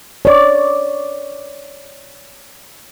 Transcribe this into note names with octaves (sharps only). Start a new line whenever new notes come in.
C#5 D5